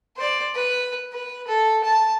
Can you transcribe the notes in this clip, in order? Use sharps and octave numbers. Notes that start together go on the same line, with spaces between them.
C5 D5
B4
B4
A4
A5